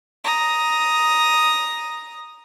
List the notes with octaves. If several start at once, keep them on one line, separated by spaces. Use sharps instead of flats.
A#5 D#6